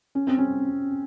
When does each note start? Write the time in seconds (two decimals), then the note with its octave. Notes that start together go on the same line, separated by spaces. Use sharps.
0.15 C#4
0.27 C4
0.38 C#4